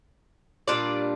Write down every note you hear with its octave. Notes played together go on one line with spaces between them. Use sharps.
A#2 G3 D4 F4 D5